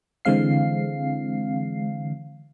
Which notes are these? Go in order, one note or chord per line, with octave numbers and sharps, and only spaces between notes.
D3 E3 G#3 C4 F5 C7